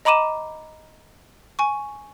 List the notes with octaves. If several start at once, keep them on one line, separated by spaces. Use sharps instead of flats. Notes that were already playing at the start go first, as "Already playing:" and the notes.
D#5 A#5 B5 D6 D#7 E7
G#5 C#6